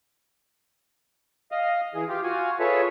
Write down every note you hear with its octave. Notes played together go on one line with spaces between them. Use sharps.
D#5 F5
E3 G#4
F4 G4
F4 F#4 G#5
F4 G#4 A4 B4 C#5 E5